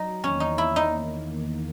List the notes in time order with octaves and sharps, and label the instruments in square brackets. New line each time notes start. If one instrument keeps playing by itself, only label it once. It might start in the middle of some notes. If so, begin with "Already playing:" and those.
Already playing: [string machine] F#3 [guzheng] D#4
[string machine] E2 D#3 A#3 [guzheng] C#4
[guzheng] D#4
E4
D#4